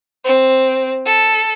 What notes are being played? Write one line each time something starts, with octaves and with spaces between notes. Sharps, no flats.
C4
A4